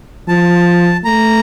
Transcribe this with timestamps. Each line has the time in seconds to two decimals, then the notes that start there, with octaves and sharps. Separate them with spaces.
0.28 F3 A5
1.04 A3 A#5